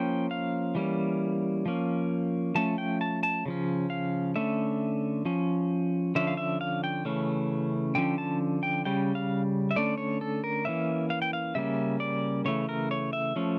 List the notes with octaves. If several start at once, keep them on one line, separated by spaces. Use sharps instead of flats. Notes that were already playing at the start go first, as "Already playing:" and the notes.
Already playing: F3 A#3 C#4 G5
F5
E3 G3 A#3 C#4
F3 A#3 C#4
F3 A3 C#4 A5
G5
A5
A5
C#3 F3 C#4
F5
D3 A3 C#4 E5
F3 C#4
D3 F3 C#4 E5
F5
E5
F5
G5
C#3 E3 A3 C#4
D3 F3 C#4 G5
A5
G5
C#3 G3 C#4 G5
F5
E5
D3 A3 C#4 D5
C#5
A4
A#4
E3 A#3 C#4 E5
F5
G5
F5
C#3 G3 A#3 C#4 E5
D5
C#3 E3 A3 C#5
A#4
C#5
E5
F3 A3 C#4